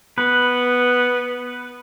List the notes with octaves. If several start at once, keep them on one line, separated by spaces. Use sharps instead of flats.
B3 B4